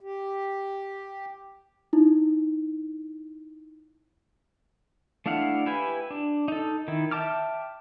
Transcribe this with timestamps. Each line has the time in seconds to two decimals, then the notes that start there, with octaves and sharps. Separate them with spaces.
0.01 G4
1.93 D#4 E4
5.26 A3 D4 E4 F5 F#5
5.66 E4 G4 B4 G#5
6.11 D4
6.48 D#4 A4
6.88 D#3 E4
7.11 E5 G5 A5 D6 F6